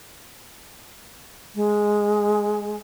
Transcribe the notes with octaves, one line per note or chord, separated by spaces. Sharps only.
G#3